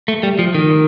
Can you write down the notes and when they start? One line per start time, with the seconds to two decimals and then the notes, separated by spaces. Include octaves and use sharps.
0.08 A3
0.23 G3
0.39 F3
0.54 D#3